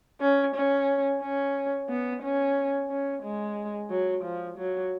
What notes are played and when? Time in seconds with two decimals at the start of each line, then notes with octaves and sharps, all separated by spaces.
0.21 C#4
0.55 C#4
1.22 C#4
1.89 B3
2.22 C#4
2.90 C#4
3.23 G#3
3.90 F#3
4.24 F3
4.58 F#3